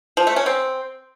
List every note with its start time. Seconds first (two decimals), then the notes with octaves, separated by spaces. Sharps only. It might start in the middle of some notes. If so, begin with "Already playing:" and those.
0.17 F3
0.27 A3
0.36 C#4
0.46 C4